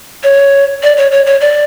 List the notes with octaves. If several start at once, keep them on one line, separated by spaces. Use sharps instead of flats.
C#5
D5
C#5
C#5
C#5
D5